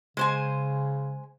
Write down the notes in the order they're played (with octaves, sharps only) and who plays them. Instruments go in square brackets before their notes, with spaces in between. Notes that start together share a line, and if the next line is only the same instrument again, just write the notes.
[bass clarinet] C#3 [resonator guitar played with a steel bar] G#3 C5 G#5